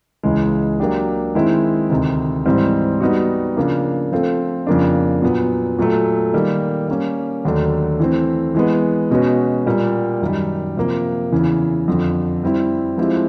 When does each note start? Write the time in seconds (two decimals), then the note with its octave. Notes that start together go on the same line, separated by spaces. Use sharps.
0.23 C#2 C#3 E3 G#3
0.79 F#3 A#3 D4 G4
1.35 D#3 G#3 C4 E4
1.90 D2 C3 D#3
2.45 G#2 E3 G3 C4
3.00 G3 B3 D#4 F#4
3.57 C#3 F3 A#3 D4
4.12 F3 A3 C4 F4 A4
4.67 F2 C#3 F3 A#3 D4
5.22 A#2 F#3 B3
5.79 A#2 F#3 A3
6.33 D#3 G3 A#3
6.88 G3 A#3 C#4
7.45 D#2 D3 F#3 A3 D4
8.00 E3 A3 C4
8.54 E3 G#3 B3
9.11 B2 G#3 C#4 F#4 B4
9.66 A#2 G3 A#3
10.21 F#2 D#3 G3
10.77 C3 F3 A#3
11.32 E2 C#3 E3
11.88 F2 D3 F3
12.43 G3 C4 E4
12.98 F3 G#3 C4 E4 G4